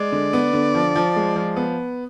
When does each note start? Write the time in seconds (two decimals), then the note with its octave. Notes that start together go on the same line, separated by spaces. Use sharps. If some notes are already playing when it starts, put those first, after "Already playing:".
Already playing: G#3 D5
0.12 D3
0.33 B3
0.53 D3
0.75 F3
0.96 F3
1.16 G#3
1.36 F3
1.56 B3